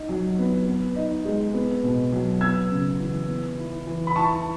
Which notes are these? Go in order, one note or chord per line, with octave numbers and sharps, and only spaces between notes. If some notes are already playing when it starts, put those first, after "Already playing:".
Already playing: D#4
F#3
B3
B3
D#4
G#3
B3
B2
F#3
B3 E6 G#6
C#3
E3
B3
E4
E3
B5
E4 A5 C#6